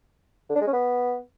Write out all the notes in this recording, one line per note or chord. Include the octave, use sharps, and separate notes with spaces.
D3
D4
G#3
C#4
B3